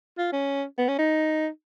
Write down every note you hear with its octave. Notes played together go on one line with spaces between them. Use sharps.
F4
C#4
B3
C#4
D#4